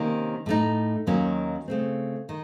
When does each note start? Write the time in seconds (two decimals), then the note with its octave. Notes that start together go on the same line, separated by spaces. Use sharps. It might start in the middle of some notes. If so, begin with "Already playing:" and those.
Already playing: C3 D#3 A#3 C#4
0.46 A2 A3 D#4
1.07 D#2 D#3 F#3 A#3 C#4
1.68 C#3 A3 C4
2.29 D#3